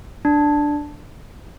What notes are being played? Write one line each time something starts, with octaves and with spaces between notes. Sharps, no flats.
D4